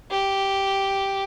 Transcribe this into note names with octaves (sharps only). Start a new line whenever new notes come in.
G4